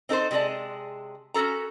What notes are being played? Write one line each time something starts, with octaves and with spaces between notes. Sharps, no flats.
C4 D#4 A4 A#4 C5
C3 G#3 G#4 D5 A5
C#4 F#4 G#4 A4 A#5